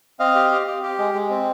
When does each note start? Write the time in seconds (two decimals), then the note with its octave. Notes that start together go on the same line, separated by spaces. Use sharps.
0.20 C4 D#5 F5
0.35 G4
0.51 G4
0.67 G4
0.83 G4
0.98 G#3
1.14 G#3
1.30 C4